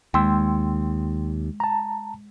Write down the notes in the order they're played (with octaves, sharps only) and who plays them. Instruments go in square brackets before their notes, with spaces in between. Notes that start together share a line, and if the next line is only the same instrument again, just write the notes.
[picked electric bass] D#2 [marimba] G#3 [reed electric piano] G5 C6 E6
[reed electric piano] A5 A#5